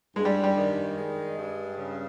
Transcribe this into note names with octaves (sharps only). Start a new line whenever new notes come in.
G2 G#3
G3
G3
D#3
G#3
G2
C#3